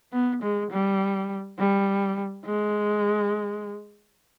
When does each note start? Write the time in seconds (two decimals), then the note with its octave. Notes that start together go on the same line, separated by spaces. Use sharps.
0.13 B3
0.43 G#3
0.72 G3
1.59 G3
2.46 G#3